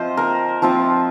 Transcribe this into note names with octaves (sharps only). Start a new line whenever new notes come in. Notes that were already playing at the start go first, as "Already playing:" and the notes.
Already playing: F3 C4 F4 C5 D#5
A#4
F3 C4 F4